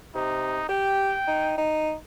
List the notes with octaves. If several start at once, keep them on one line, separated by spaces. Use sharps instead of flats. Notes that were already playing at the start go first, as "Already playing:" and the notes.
C3 D#4
G4 G5
D#4
D#4